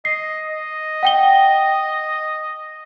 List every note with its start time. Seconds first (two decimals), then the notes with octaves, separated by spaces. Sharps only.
0.05 D#5 C7
0.49 D#5
1.03 F#5 G5 G7